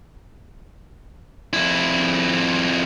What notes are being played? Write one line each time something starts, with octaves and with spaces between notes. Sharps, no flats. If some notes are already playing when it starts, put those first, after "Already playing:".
F2 E4